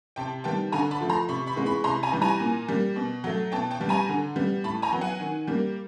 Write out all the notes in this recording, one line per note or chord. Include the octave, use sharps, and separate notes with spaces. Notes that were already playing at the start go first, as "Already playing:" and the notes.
C3 G5 A5
D#3 G3 B3 G5 A5
D3 G#5 A#5
A5 B5
F3 A3
A#5 C6
C3 B5 C#6
B5 C#6
E3 G#3 B3
B5 C#6
C3 A#5 C6
G#5 A#5
E3 G3
G#5 A#5
A#2
G3 A#3
B2
F#3 A3
B2 G5 A5
G5 A5
G3 B3
G#5 A#5
D3
G3 B3
A2 A5 B5
G#5 A#5
F#3 B3
F#5 G#5
D#3
G3 A#3